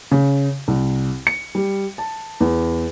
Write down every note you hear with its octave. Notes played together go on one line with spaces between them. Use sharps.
C#3
C2
C#7
G3
A5
E2